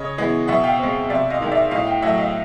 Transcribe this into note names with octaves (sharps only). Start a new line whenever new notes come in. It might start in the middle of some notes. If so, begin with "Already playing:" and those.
Already playing: C#3 C#5 D#5
E3 G#3 B3
B2 E5 F#5
F5 G5
G#3 C4
C3 D5 E5
D#5 F5
D#3 G#3 F5
D5 E5
A2 D#5 F5
F5 G5
F#3 A3 E5 F#5
D#5 F5